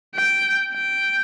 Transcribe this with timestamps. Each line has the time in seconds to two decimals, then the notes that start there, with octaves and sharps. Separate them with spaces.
0.15 G5
0.73 G5